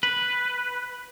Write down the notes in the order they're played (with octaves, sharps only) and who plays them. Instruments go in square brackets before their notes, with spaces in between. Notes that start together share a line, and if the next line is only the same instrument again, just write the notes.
[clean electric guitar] B4